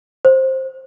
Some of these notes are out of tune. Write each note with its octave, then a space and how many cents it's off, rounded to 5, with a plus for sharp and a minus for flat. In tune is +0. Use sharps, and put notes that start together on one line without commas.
C5 +15